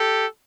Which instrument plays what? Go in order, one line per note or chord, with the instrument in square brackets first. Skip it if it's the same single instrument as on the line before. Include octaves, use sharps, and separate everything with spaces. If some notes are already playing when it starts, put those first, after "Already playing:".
Already playing: [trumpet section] G4 A4